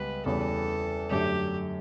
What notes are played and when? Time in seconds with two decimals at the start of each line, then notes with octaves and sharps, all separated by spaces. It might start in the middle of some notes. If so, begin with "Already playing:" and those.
Already playing: C#2 G3 B3 B4
0.26 E2 C#3 E3 G3 A4
1.10 F#2 D3 A3 D4 G4